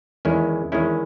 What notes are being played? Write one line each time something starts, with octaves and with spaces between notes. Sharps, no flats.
E2 D#3 G#3 C#4 E4
E2 D#3 G#3 C#4 E4